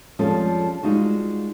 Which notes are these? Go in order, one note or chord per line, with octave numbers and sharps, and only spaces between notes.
F2 F3 G3 G#3 C#4 A4
G3 G#3 D#4 F4 F#4